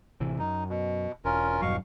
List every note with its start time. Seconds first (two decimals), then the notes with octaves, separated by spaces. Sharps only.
0.20 A1 C3 E3
0.39 F#2 D#4
0.69 B2
1.25 E1 C#4 F4 A#4
1.62 E1 G2 B2 F#3 F5 C#6